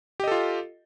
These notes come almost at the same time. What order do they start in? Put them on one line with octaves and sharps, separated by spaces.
G4 D#5 A4 F4